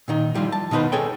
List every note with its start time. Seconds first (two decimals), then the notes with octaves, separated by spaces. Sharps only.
0.08 A#2 D#3 D#4
0.34 F3 G3 E4 F4
0.52 A5
0.71 B2 D#3 D#4 B4 C5
0.92 D#4 G#4 A4 C#5 G5